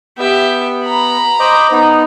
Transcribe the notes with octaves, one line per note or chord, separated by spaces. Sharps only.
B3 G4 E5
A#5 B5
C5 D#5 D6
B3 D#4